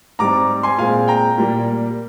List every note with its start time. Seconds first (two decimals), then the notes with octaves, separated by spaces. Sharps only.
0.19 G#2 G3 C4 A#5 D6
0.63 G#5 C6
0.78 A#2 G#3 C4 F5 G#5
1.08 G5 A#5
1.38 A#2 G3 A#3